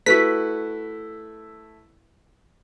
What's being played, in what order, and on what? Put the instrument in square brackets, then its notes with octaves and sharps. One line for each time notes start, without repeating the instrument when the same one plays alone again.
[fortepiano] A3 E4 [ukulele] F#4 B4 [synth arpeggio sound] B6